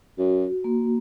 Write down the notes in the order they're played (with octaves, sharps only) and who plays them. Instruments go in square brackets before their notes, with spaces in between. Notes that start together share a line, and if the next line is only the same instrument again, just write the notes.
[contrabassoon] F#2 [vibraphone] F#4
[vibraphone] A#3